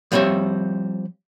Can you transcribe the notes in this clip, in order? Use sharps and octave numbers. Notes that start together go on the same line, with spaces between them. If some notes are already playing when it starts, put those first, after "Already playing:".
F3 G3 C4 C#5 E5